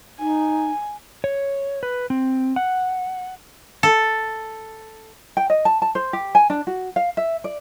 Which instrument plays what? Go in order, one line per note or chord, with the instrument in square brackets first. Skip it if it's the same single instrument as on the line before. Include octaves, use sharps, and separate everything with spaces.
[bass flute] D#4 [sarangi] G#5
[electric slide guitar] C#5
B4
C4
F#5
[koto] A4
[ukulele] G5
D#5
A5
A5
C5
G4
G#5
D4
F#4
F5
E5
D5